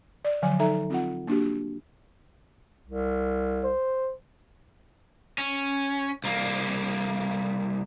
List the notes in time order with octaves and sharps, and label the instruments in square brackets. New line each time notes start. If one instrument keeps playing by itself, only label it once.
[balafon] D5
D3 F3 F#3 G#5
D#4 A4 E5 A#5
C4 F4 F#5
A#3 D4 F#4 G4
[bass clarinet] C2
[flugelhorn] C5
[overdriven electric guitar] C#4
C2 A#3